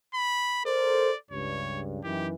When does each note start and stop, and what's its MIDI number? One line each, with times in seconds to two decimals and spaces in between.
0.14 0.61 83
0.65 1.09 69
0.65 1.09 70
0.65 1.09 72
0.65 1.17 74
1.31 2.02 37
1.31 2.02 43
1.31 1.80 73
2.03 2.33 42
2.03 2.33 51
2.03 2.33 52
2.03 2.27 67